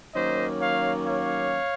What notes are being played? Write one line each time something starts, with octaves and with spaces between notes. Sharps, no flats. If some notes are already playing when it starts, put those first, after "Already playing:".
D#3 F#3 A#3 C#4 C5 D#5
C#5 F5
C#5 F5